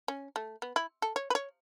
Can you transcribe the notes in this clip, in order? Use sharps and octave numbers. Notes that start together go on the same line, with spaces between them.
C#4
A3
B3
E4
A4
C#5
B4
C#5